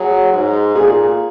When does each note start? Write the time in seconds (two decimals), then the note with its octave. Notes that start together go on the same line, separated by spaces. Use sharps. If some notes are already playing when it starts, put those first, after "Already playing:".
Already playing: F#3 G#4
0.33 G#2
0.75 A#2 G#4